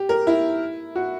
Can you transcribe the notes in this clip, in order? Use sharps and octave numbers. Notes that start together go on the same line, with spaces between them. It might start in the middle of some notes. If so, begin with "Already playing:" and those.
Already playing: G4
A#4
E4
F#4